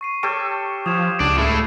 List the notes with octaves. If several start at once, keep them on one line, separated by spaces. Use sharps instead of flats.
C#6 C7 D#7
G4 A4 C#5 F6 D7 E7
F3 D#6 G#6 E7
C#2 D4
A3 E4 G6 C7